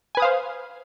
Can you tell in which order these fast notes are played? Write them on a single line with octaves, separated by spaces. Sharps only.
G#5 B4 D#6 F5 C5